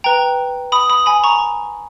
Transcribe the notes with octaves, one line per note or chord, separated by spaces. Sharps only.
B4 G5 A#5
B5 D#6
B5 D#6
G#5 B5
A#5 C#6